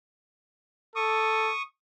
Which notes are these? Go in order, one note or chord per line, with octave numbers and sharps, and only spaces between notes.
A4 C#6 D#6